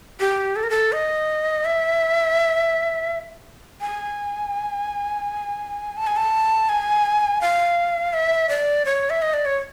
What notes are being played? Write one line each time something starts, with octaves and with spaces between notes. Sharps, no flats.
G4
A4
A#4
A4
D#5
E5
G#5
A5
G#5
A5
G#5
F5
E5
D5
C#5
E5
D#5
D5
C#5